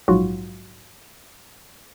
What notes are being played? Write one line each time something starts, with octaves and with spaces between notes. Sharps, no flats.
A#1 G#2 F#3 F4 F#4